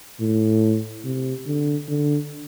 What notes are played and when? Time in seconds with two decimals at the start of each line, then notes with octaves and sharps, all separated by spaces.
0.20 A2
1.05 C3
1.47 D3
1.88 D3